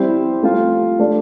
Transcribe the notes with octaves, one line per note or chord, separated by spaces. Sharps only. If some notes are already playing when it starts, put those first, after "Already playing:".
Already playing: G3 C4 E4 G4 C5
A3 C4 F4
A3 D4 G4 D5